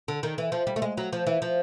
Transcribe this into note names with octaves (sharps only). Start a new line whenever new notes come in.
D3
D#3
E3
F3
G3
A3
G#3
F#3
F3
E3
F3